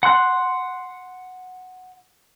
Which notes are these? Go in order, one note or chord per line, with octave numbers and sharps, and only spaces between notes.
F#5 C6 F#6